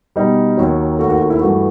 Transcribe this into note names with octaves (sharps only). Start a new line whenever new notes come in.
B2 G3 D#4
D#2 D#3 F#3
D#2 D#3 A3 F#4
F#4
F#4
E4
G2 E3 A3 F#4